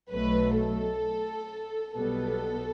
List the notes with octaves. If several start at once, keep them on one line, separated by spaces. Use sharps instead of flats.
B1 B2 F#3 A3 B4
A4
B1 B2 G3 B3 A4